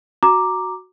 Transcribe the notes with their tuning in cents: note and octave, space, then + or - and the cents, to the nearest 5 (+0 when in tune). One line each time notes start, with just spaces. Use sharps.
F#4 +0 A#5 +0 D6 +5